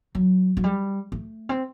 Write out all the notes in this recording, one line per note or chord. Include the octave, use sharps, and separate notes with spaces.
F#3
F#3
G3
A3
C4